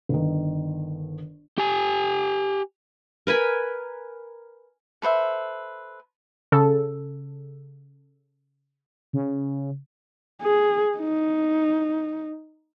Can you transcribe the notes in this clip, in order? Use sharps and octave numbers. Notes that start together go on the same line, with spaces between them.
G1 D#3
G4 G#5
A#4 B4 G#5 B5
A4 B4 C5 E5
C#3 A4
C#3
G#4
D#4